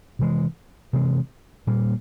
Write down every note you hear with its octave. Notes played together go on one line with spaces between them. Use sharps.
C3 E3 G#3
C3 E3 G#3
A#2 G3 A#3